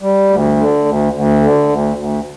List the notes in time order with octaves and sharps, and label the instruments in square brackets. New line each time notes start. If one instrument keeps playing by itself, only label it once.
[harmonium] G3
D2
D3
D2
D2
D3
D2
D2